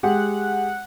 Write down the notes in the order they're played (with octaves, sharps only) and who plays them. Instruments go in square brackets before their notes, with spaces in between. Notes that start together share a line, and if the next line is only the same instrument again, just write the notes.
[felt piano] G#3 G4 [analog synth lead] F#5